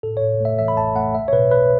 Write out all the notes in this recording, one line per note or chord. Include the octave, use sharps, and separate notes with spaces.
A2 A4
A2 C#5
A3 E5
E3 E5
B5
A1 A5
A3 F#5
B1 E5
C#5
B2 B4
B1 B4